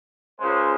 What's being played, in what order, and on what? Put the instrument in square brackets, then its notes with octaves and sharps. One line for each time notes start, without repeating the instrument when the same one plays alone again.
[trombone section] C#2 C#3 G#3 C5